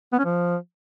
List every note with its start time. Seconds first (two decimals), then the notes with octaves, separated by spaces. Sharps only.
0.13 B3
0.19 C#4
0.25 F3